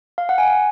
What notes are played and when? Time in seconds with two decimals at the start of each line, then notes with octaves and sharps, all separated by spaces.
0.18 F5
0.29 F#5
0.38 G#5